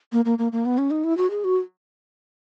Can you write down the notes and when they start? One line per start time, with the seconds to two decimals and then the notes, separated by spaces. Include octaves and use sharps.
0.13 A#3
0.25 A#3
0.39 A#3
0.52 A#3
0.65 B3
0.78 C#4
0.91 D#4
1.04 E4
1.17 F#4
1.30 G#4
1.44 F#4